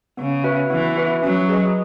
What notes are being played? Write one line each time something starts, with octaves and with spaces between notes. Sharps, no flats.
C#3 B3
F#4 B4 E5
E3 B3
F#4 B4 E5
F#3 C#4
G#4 B4 D#5